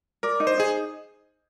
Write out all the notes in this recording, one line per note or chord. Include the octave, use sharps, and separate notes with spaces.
A#4 D5
D#4
C5
D#4 G#4